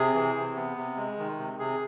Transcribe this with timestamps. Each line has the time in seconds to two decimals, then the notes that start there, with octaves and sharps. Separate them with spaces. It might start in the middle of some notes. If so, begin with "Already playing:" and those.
Already playing: C3 G#4
0.14 E3
0.35 C3
0.56 B3
0.77 C3
0.97 G#3
1.18 D#3
1.38 C3
1.59 C3 G#4